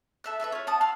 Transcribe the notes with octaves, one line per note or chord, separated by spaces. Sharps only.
A4 E5 F#6
E4 A4 B4 E5
F4 C#5
F#5 A5 D#6
F5 F#5 C6 E6